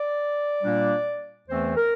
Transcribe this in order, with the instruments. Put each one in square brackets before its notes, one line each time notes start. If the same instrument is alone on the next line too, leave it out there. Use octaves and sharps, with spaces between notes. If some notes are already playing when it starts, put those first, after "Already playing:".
Already playing: [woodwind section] D5
A#2 G3 A#3 D4
E2 E3 A3 C4 C5
A#4